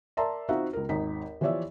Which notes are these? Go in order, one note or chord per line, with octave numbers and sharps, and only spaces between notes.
A#4 D5 E5 A5 A#5 C6
C4 D#4 F4 F#4 E5 F#5
C#2 A#4
G#1 D#2 D#4 B6
E3 F3 G4 C#5 D5 E5